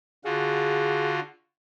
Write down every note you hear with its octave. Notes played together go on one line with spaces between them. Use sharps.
D3 F4 F#4 G#4